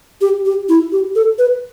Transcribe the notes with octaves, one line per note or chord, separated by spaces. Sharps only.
G4
G4
E4
G4
A4
B4